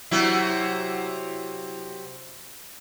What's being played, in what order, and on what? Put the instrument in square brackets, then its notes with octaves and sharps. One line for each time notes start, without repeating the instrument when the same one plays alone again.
[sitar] C3 F#3 E4